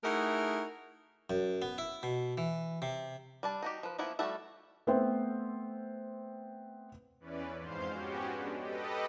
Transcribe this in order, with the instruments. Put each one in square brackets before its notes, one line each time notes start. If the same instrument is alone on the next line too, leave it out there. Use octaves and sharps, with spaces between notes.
[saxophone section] A3 D#4 E4 F#4 G#4 A#4
[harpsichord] F#2
B3
E4
B2
E3
C3
[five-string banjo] G3 D4 A5
D#4 F#4 G4
F3 B4
F3 A#3 B3 E4
G3 A3 F#4 A4 E5
[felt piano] A3 B3 C4 C5 E5
[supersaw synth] E2 E3 C#4 B4 D5
F2 G#2 C5 F5 C6 G6
B3 C#4 F#4 G4
G#3 D4
G4 A4 B4 D#5